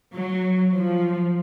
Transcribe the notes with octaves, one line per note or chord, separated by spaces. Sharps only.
F#3
F3